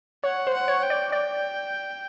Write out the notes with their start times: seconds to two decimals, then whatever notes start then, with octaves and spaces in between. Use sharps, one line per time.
0.24 C#5 F#5
0.47 C5
0.54 F#5
0.68 C#5
0.83 G5
0.90 D5
1.12 D5 G5